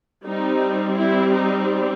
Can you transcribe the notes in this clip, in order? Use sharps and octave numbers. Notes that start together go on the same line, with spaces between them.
G3 C4 D#4
E4
D#4